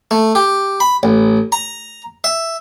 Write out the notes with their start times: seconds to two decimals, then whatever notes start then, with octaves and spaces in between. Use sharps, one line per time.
0.11 A3
0.35 G4
0.80 B5
1.03 A1
1.52 A#5
2.24 E5